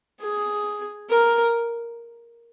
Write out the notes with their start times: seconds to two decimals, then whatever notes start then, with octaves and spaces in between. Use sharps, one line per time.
0.22 G#4
1.10 A#4